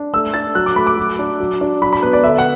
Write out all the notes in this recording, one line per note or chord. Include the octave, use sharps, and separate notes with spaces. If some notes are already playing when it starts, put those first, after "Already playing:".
Already playing: D4
A3 E6
D4 A6
F#3 F#6
D6
A3 B5
D6
F#3
D4
F#3
D4
F#3 B5
B5
B3 B4
D5
D3 E5
F#5